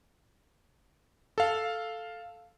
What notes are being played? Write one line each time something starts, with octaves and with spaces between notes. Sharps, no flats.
A4 F5